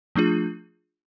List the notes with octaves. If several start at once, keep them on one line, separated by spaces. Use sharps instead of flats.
F3 A3 D4 F4 G#4